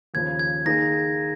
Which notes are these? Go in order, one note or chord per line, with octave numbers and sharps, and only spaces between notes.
D#2 C#3 F3 G#6
G#6
D#3 A#3 D#4 G#4 A#6